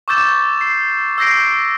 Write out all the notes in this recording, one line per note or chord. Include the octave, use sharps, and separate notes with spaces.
C#6 D6 E6 G6 A6 E7
C7
E6 G6 A#6 C7 D7